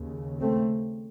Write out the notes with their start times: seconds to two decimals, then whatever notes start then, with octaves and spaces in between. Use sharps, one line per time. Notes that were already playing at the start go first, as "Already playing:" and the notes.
Already playing: D#2 C#3
0.41 A3 C4